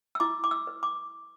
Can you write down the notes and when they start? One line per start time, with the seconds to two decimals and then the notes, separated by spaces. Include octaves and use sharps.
0.15 E6
0.20 E4 D6
0.44 D6
0.51 E6
0.67 B4
0.83 D6